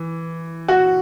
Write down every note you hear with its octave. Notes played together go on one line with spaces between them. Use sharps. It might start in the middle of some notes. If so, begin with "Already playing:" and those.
Already playing: E3
F#4